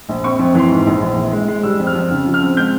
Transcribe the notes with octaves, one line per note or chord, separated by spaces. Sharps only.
A#1
C4 C#6
F2
E3 C6
G#2
A#1
A#1
E3
G#3
G#3
G3 E6
F2
F6
F2
C#3
F3
F6
C4
G#3 G6